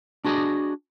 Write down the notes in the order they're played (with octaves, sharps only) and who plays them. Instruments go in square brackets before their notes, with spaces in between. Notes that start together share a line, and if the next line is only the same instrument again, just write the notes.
[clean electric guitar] D4 F#4 G#4 B4 D5 D#5